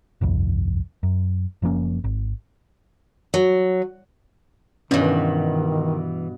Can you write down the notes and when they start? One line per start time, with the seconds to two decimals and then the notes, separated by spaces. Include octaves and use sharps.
0.21 G1 C2 F2
1.03 F#2
1.62 F#1 F3 A#3 C#4
2.04 G#1
3.34 F#3
4.91 G2 B2 D#3 E3 C#4